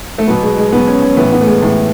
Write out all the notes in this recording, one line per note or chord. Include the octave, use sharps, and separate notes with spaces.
A3
B2 F#3 B3
G#3
G#3
B2 F#3 B3
C#4
C#4
A2 E3 B3
B3
A3
G#3
A2 E3 G#3